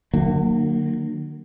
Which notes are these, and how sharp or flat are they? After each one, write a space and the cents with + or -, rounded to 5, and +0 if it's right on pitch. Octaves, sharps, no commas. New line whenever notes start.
D3 +45 F#3 -5 A#3 -15